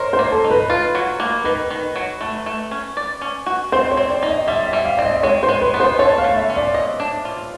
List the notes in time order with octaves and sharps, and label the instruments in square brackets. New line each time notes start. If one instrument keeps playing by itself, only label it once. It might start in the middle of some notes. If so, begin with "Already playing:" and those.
Already playing: [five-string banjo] A#4 [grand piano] C5 C#5 D#5
[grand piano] C5
[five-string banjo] A#3
[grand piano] A4
[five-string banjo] D#4
[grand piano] B4
[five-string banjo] F4
F#3
A#3
[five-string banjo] D#3 [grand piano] B4
[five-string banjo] D#3
F#3
A3
A3
C#4
D5
C#4
F#4
[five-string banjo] C4 [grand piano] C5
[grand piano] C#5
[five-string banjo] C4
[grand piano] D5
[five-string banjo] D#4
[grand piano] D#5
[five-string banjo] G3 [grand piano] E5
[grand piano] E5
[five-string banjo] G3
[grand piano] F5
[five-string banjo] C4 [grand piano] D5
[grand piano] D#5
[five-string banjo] G#3 [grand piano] C#5
[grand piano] C5
[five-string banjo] G#3
[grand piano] B4
[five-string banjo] B3
[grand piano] C5
[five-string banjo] A4 [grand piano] C#5
[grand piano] F5
[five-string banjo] A3
[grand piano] E5
[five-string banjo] C#4
[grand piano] D5
[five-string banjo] D#5
D4
F4